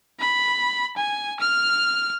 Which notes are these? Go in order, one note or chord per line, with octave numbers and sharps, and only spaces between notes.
B5
G#5
F6